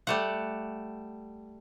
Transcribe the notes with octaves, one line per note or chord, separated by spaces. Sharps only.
G3 A3 F#5